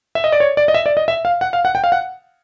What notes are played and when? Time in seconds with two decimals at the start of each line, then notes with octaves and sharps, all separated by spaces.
0.15 E5
0.24 D#5
0.32 D5
0.40 C#5
0.57 D5
0.68 D#5
0.74 E5
0.86 D5
0.97 D#5
1.08 E5
1.25 F5
1.41 F#5
1.53 F5
1.65 F#5
1.75 G5
1.84 F5
1.92 F#5